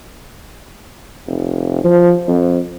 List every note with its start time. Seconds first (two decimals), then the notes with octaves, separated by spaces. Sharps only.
1.27 F1
1.84 F3
2.27 F2